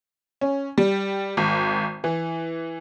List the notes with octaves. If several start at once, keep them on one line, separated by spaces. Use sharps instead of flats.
C#4
G3
G#1
E3